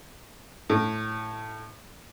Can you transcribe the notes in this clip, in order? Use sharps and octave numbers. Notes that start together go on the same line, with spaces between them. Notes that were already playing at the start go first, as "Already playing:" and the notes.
A2